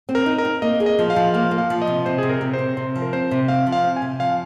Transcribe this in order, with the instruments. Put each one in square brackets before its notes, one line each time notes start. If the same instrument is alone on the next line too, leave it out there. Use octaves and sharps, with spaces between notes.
[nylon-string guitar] C4
[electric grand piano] A#4
[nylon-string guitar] D#4
[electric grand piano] A#4
[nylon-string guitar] C4
[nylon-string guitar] A#3 [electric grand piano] D#5
[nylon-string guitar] G#4
[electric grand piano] D#5
[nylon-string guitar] F3
[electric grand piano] F5
[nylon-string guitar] F3
[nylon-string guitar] A#3 [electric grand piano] F5
[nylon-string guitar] A#3
[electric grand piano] F5
[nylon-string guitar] F3
[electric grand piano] D#5
[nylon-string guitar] C3
[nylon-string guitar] C3 [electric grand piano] C5
[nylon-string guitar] C3 [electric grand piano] G#4
[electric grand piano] A#4
[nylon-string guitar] C3
[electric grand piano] C5
[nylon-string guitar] C3
[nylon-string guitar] C3 [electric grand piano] C5
[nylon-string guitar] F3
[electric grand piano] A#4
[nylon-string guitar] C4 [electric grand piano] C5
[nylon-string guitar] C3
[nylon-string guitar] C4 [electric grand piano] F5
[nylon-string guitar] F3
[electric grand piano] F5
[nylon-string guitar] C4
[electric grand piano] G#5
[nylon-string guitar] C3
[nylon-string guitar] F3 [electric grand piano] F5